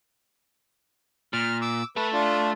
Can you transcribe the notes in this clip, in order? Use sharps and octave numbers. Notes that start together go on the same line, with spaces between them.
A#2 F6
D6 E6
A3 A4 B4
D4 F4